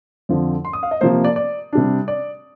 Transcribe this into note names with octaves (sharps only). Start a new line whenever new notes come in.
F2 D3 F3 C4
C6
D#6
F5
D#5
C3 F3 A#3 C5
D5
D5
C3 G3 D4
D5